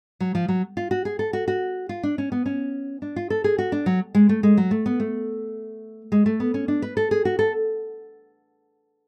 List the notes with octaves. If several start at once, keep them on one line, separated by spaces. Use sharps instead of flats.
F#3
F3
F#3
F4
F#4
G#4
A4
F#4
F#4
F4
D4
C#4
B3
C#4
D4
F4
A4
G#4
F#4
D4
F#3
G#3
A3
G#3
F#3
A3
B3
A3
G#3
A3
B3
C#4
D4
B4
A4
G#4
F#4
A4